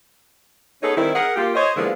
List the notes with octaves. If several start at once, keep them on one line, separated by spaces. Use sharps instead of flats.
B3 C#4 D#4 G#4 A4 C#5
D#3 G3 C4 E4
G#4 A#4 F#5
A#3 F4 G4
C5 C#5 D#5
D3 F3 G#3 A#3 B3 E4